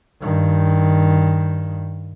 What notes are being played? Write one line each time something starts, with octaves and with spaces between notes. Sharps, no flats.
G2 D#3